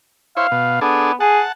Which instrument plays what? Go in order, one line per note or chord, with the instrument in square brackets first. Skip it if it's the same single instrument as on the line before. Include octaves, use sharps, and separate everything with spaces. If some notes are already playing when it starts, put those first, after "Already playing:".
[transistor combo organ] E4 C5 C#5 [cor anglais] F5
[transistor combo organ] B2
[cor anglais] B3 [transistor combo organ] D4 G#4 A4
[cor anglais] G#4 [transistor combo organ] F#5 A5